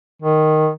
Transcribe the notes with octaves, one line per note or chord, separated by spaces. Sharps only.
D#3